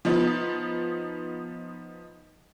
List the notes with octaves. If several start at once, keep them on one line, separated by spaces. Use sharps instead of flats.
F3 B3 D#4